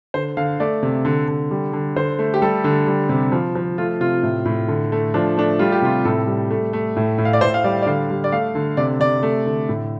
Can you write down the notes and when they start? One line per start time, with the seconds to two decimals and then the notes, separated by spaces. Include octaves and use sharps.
0.14 D3 C5
0.37 D3 F5
0.60 A3 D5
0.83 C3
1.05 D3
1.28 D3
1.51 G3
1.73 D3
1.96 D3 C5
2.19 A3
2.34 G4
2.42 G3 A4
2.64 D3
2.87 G3
3.09 C3
3.32 F3
3.55 F3
3.78 A3 F4
4.00 C3 F4
4.23 A2
4.45 A2
4.68 D3
4.92 A3
5.14 F3 D4
5.37 A3 D4
5.59 G3 F4
5.72 G4
5.82 C3 F4
6.05 A2 A4
6.27 G3
6.50 A3
6.73 A3
6.97 A2
7.18 A2
7.25 F5
7.33 D5
7.41 A2 C5
7.54 F5
7.64 G3 D5
7.82 D5
7.86 D3 F5
8.10 G3
8.24 D5
8.32 A3 F5
8.55 D3
8.77 C3 D5
9.00 C3 D5
9.23 A3
9.46 D3
9.69 A2